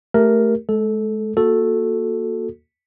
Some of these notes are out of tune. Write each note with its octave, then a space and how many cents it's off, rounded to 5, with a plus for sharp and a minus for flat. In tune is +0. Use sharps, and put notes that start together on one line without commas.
A3 +0 G4 +0 A#4 +0
G#3 +35 A4 -15
A#3 +0 F#4 -20 A4 +0